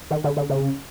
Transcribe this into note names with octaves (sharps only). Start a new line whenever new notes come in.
D#3
D3
D3
C#3